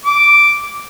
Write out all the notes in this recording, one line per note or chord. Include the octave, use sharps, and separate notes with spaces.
D6